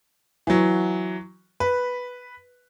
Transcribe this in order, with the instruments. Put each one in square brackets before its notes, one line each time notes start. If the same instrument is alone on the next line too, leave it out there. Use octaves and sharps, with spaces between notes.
[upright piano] E3 F#3
B4